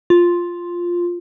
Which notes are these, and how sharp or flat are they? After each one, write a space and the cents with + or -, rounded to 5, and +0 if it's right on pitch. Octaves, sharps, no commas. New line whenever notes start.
F4 +0